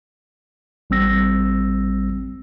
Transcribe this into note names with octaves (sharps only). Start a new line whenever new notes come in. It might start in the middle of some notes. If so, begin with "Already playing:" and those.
A1 G3 C4 E6 A#6